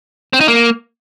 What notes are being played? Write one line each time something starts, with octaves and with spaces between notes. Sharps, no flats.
C4
D#4
A#3